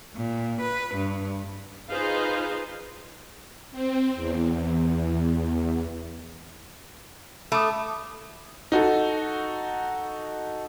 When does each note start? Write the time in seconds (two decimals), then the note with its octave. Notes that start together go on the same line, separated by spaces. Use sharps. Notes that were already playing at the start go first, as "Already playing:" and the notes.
0.16 A#2
0.60 B4
0.95 G2
1.90 D#4 F4 G#4 B4 C5 F5
3.72 C4
4.15 E2
7.52 A3 B5 D6 D#6
8.72 D#4 F#4 A4